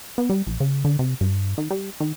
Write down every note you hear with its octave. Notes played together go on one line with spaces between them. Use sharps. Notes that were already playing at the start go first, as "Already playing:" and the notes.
B3
G3
A#1
C#3
D3
C3
G2
D#3
G3
D#3